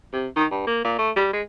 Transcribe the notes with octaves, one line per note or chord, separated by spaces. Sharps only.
C3
D#3
G2
A#3
A#2
A3
G3
G#3